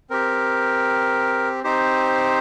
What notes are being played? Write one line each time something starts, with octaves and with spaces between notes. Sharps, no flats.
C4 G4 A#4
C4 D#4 G4 C5